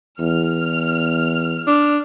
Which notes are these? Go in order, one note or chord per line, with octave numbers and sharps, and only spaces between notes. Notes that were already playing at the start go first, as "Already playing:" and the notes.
E2 F6
D4